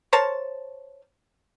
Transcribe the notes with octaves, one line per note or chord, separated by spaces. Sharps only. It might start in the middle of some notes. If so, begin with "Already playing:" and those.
A#4 C5 C#5 A5